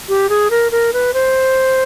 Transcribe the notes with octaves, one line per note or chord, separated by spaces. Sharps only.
G4
G#4
A#4
A#4
B4
C5